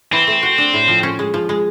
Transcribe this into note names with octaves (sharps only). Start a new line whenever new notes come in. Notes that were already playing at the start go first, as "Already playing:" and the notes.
E3 C4
A3
F#4
D4
A2
F3
C#4
G#3
F3
G#3